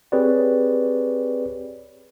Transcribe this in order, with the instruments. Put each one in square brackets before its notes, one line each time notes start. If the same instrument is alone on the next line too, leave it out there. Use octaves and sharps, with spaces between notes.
[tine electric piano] C4 G4 G#4 B4 C#5 D5